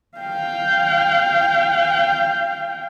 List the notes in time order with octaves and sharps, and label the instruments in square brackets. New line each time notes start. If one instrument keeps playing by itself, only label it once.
[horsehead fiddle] F5 G5